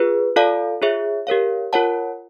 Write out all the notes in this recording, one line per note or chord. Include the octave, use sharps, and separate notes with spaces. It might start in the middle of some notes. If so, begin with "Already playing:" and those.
Already playing: F4 G#4 B4
F4 A4 D5 F5 A5
F4 G#4 C#5 E5
G4 A#4 C#5 F5
F4 A#4 C#5 F#5 A5